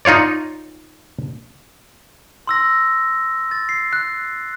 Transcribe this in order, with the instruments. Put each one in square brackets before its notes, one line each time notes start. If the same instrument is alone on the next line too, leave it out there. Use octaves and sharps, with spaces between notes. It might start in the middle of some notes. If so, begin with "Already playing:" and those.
[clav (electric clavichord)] D#4 F4 C#5 D5
[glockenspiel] C6 E6 A#6
A6
C7
F#6